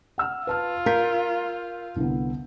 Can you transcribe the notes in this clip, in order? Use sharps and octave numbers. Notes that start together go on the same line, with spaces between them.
F#5 E6 F6
F4 B4 A5 F6
A#4 F5 G6 B6
C2 D3 B3